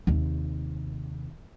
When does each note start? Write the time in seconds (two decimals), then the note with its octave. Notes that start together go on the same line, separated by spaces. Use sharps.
0.07 D#2 C3